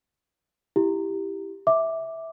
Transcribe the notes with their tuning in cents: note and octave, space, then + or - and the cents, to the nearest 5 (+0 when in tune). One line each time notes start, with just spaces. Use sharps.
E4 +0 G4 +0
E5 -15 D6 +0